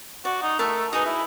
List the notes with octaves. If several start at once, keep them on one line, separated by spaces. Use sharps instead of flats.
F#4 D5
D#4
A3 A#4 E5 A5
D#4 F#4 G#4 B4
E4